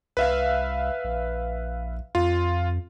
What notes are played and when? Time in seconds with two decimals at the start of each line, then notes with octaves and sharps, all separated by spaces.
0.17 C2 B4 E5 F5
1.04 A#1
2.15 F2 F4